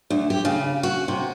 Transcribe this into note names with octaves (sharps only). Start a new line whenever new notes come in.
D2
G4
C#3
F#4
C3